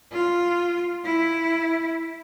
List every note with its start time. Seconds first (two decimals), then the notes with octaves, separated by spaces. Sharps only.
0.12 F4
1.04 E4